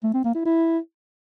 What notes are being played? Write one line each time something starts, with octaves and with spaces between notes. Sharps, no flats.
A3
C4
A#3
E4
E4